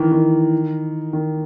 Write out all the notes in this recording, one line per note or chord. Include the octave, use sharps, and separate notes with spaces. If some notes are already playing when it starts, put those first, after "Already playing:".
Already playing: D#3 E3
D#3
D#3